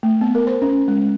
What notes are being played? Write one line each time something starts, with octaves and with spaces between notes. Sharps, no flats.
A3
B3
A#4
C5
C#4
G#3